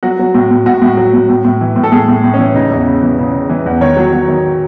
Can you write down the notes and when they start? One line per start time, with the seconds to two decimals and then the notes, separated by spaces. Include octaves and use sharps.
0.03 F#3 F#4
0.19 F#3
0.34 A2
0.51 A2
0.66 A2 F#4
0.82 A2
0.97 F#3
1.14 A2
1.29 A2
1.44 A2
1.61 E3
1.76 A2
1.83 A4
1.92 A2 G#4
2.08 A2
2.24 A2
2.34 C#4
2.39 E3
2.55 C#3 D#4
2.71 E2
2.86 C#3
3.02 E3
3.19 C#3
3.33 C#3
3.49 E3
3.66 E2
3.81 D#3 C#5
3.97 F#3
4.12 F#3
4.28 D#3